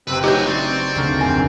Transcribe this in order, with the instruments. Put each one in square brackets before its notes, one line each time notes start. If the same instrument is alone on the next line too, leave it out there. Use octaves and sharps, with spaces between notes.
[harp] F#1 G5 [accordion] C3 C4 E6 [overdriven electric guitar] B4
[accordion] E3 F#3 [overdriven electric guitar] A3 D#5 [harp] D#4 F#4 [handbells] G4 G6
[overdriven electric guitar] C4 [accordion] D5 C#6
[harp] D2 C#3 A#4
[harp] B1 F2 [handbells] G#5